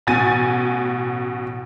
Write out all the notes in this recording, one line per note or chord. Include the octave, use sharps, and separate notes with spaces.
A1 B2 G#5 A6 D#7